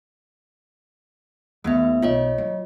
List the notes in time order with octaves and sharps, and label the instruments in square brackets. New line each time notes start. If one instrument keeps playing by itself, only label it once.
[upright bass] D#2 [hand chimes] A3 B3 E5
[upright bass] B1 [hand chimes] F4 C#5 D#5
[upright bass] F#3